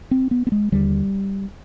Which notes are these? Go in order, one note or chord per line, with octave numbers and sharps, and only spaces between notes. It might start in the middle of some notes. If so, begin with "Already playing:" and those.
C4
B3
B3
G#3
D#2 D3 G3